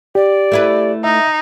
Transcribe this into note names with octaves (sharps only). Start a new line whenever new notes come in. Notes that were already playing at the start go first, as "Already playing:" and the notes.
G4 D5
A3 E4 B4
D#4 E5